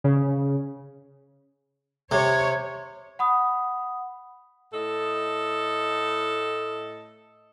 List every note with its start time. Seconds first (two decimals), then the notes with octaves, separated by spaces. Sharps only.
0.04 C#3
2.11 C3 C#5
3.19 F#5 B5 D#6
4.72 A2 A4 D#5